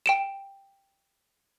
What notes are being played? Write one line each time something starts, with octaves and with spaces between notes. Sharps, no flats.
G5 D7 E7